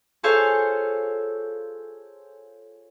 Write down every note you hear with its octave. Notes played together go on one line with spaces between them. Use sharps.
F4 G#4 A4 C5 C#5 F5